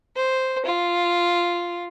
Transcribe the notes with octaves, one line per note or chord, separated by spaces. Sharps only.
C5
F4